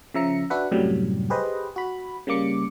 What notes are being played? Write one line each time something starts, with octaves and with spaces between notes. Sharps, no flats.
C#3 F3 E5 A#5 C#7
D4 F#4 B4 E5 F#5
F#2 A2 C3 F#3 G3
G4 G#4 B4 C5 D#5
F#4 B5
C#3 G3 A#3 D6 C#7